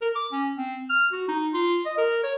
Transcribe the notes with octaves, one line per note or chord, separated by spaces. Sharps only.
A#4
D6
C#4
C4
F6
F#4
D#4
F4
D#5
A#4
C#5